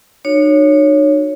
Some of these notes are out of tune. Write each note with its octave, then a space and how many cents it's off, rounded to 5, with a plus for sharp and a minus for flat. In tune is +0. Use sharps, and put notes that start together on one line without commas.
D#4 -45 F#4 -25 C#5 +0